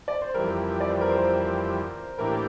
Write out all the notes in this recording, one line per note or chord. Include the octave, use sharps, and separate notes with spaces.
D5
C5
F2 E3 G3 A#4
D5
C5
A#4
C5
A2 E3 A#3 D4 G4 A#4